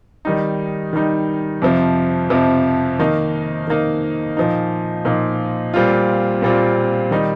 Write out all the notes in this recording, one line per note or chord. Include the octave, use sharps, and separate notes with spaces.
D#3 G3 D#4
D#3 G3 D#4
F2 C3 F3
F2 C3 F3
D#3 A#3 D#4
D#3 A#3 D#4
A#2 F3 D#4
A#2 F3 D#4
A#2 G3 C4 F4
A#2 G3 C4 F4
D#3 G3 D#4